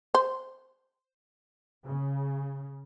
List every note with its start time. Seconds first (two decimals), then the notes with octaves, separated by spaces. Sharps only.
0.15 C5
1.85 C#3